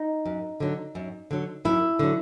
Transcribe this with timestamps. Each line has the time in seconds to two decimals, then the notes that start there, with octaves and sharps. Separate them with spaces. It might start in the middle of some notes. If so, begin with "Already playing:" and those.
Already playing: D#4
0.26 F#2
0.60 D3 F#3
0.95 F#2
1.31 D3 F#3
1.65 F#2 E4
1.99 D3 F#3